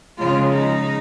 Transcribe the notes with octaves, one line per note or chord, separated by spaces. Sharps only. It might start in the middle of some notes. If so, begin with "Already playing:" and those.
C#3 F3 G#3 F4
D#4